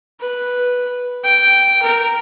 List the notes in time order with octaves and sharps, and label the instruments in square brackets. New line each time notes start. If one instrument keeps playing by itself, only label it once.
[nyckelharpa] B4
G5
A#4